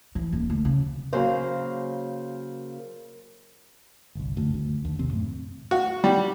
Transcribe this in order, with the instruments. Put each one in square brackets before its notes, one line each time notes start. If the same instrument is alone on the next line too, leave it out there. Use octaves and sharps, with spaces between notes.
[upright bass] E3
D#1
D2
C#3
[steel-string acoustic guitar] C#3 F#3 A#3 C5
[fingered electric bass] G1 C2
F#1 D2
D2
D#2
A#1 D#2 C3 C4
F#2 A2
[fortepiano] F#4
G3